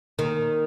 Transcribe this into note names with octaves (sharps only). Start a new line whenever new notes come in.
D#2 D#3